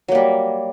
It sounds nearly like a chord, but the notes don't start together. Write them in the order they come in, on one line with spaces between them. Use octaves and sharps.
F#3 A#3 G3